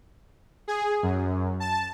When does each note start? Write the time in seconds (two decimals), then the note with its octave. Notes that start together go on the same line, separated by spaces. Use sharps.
0.68 G#4
1.03 F#2
1.60 A5